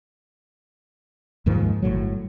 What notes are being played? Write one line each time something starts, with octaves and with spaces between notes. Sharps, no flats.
D#2 G#2 D#3 F3
G1 C2 A2 F#3